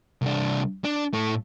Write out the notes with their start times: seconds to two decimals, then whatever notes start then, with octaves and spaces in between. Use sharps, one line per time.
0.22 C2 D4
0.84 D4
1.13 A2 A3